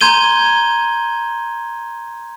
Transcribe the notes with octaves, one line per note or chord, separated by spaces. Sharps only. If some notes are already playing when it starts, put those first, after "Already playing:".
A#5 C6 G6 G#6 D#7 G7